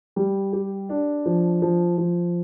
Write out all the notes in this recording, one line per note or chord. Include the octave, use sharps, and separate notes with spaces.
G3
G4
D4
F3
F3
F3